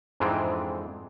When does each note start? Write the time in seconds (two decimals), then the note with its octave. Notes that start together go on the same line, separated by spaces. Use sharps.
0.20 F2 G#2 E3 G#3 C4 D4